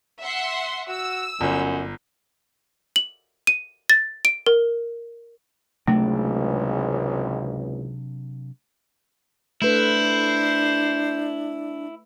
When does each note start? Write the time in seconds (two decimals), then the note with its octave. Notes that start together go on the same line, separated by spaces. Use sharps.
0.20 E5 F#5 C6
0.89 F#4 E6
1.41 G1 F#2
2.96 F#7
3.47 D#7
3.90 A6
4.25 D7
4.46 A#4
5.88 G#1 C#2 C3 F#3 A3 D4
9.62 A3 D4 E4 B4 C5